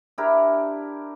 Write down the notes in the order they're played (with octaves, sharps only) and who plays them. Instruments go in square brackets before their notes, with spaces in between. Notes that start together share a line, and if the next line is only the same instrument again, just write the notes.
[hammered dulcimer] D4 E4 G4 A#4